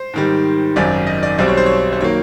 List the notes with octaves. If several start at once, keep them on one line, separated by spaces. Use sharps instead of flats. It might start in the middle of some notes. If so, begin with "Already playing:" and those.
Already playing: C5
G#2 D#3 G3
G#1 F#2 D#3 D5
D#5
D5
B1 B2 G3 C4 D5
C#5
C5
C#5
C5
D#3 F#3 A#3 C#5